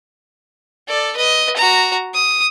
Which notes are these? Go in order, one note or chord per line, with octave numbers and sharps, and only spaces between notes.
A4 D5
B4 D#5
F#4 A#5
D#6